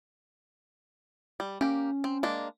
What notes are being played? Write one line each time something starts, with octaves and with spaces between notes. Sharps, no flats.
G3
A#3 C#4 G4
C4
G#3 A#3 D4